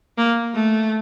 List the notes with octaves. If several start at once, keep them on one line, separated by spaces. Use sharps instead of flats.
A#3
A3